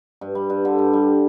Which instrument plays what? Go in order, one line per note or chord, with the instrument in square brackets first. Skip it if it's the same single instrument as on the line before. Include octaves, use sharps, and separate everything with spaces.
[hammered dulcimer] G2
G3
G2
D3
G2
G3